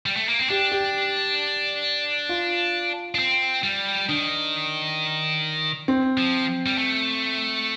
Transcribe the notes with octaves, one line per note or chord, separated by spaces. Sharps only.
G3
A3
A#3
C4
D4 G4
G4
F4
D4
C4
G3
D#3 D4
C4
F3
G3
A3